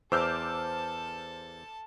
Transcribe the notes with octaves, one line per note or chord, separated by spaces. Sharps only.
E2 A4 C5 A5 D6 E6 F6 G6